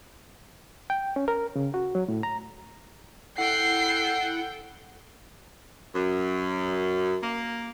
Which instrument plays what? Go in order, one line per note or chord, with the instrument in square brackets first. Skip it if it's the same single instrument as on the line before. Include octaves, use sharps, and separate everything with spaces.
[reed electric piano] G5
C#4
A#4
C#3
F#4
F#3
A2
A#5
[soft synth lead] E4 [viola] A4 G5 [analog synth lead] F#5 [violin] C7
[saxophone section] F#2
A#3